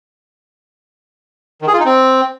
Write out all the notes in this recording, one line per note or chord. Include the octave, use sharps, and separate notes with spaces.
D#3
G#4
F4
D#4
C4